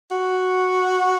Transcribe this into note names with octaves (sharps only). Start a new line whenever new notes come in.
F#4